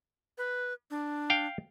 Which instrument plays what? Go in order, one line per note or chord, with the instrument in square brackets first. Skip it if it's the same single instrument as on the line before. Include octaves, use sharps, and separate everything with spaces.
[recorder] B4
D4
[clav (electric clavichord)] F5 G5